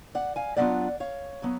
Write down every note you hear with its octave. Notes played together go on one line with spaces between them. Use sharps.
D5 F#5
F5 G#5
D3 F#3 B3 D4 F4 D5 F#5
C#5 F5
D3 F#3 B3